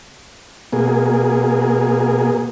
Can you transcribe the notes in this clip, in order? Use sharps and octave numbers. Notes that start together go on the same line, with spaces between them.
B2 A#3 G#4